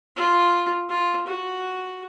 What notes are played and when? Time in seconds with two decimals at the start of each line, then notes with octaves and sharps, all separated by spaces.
0.16 F4
0.89 F4
1.26 F#4